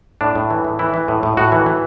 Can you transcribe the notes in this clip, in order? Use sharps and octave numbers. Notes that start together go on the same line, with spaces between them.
A2 D4
A2
E3
A2
E3 E4
E3
A2
A2
A2 F#4
E3
E3